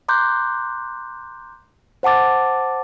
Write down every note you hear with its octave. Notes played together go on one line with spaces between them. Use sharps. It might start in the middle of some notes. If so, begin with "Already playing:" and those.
A#5 C6 D6 F#6 G6
C5 F#5 A5 D6 A6